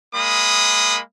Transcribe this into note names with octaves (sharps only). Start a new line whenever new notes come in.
G#3 A#3 B5 D#6